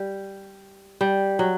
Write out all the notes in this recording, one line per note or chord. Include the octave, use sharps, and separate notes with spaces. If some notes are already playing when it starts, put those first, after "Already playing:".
Already playing: G3
G3
F#3